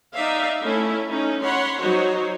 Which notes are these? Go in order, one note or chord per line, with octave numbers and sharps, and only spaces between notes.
D#4 D5 E5 F5
A3 C#4 E4
C#4 D#4
C#5 F#5 B5 C6
F#3 D#4 F#4 C5 C#5